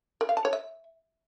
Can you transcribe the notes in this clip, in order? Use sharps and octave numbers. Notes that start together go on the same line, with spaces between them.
A#4
F5
A5
C#5
E5